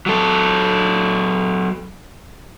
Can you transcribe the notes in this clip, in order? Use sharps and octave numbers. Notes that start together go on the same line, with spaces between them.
F#3 A4